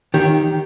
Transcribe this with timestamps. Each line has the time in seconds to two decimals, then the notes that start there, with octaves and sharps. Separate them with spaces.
0.14 D#3 G4